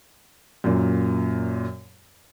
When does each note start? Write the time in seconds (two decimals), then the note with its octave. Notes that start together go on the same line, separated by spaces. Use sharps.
0.64 F#2 A#2